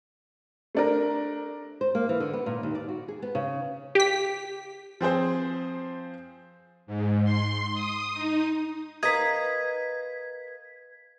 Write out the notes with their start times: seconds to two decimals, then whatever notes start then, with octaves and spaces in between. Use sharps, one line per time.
0.75 A3 D4 A#4
1.81 C5
1.95 A#3
2.09 E3
2.20 D3
2.33 B3
2.46 A#2
2.63 D#2
2.75 D5
2.89 F#4
3.08 G#4
3.22 B3
3.35 C#3
3.95 G4 B6
5.01 F3 C4 G#4 C5
6.87 G#2
7.24 C6
7.74 D#6
8.14 D#4
9.03 A#4 B4 D#5 F5 A#5 G#6 B6